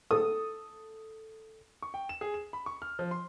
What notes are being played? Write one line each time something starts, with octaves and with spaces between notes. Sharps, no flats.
A4 D#6
C#6
G5
E7
G#4
E7
B5
C#6
F6
F3
C6